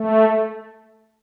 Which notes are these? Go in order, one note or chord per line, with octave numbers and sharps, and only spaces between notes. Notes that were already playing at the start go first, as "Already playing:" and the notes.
Already playing: A3